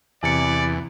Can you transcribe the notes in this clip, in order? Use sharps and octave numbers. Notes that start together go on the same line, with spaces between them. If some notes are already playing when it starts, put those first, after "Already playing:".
E2 C3 D5 G#5 C#7